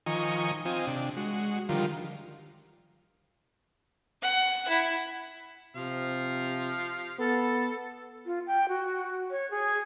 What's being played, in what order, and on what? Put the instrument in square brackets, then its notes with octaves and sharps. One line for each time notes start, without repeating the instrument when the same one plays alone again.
[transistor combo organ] D#3 F3 D#5 G#5 A#5 C#6
C4 F4 D#5 G#5
C3 D4
G#3 F#4
D3 D#3 F3 G3 F4 A#4
[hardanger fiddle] F#5
E4
[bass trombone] C3 [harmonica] F3 F5
[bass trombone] B3 [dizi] A4
[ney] F4
G5
F#4
C#5
G#4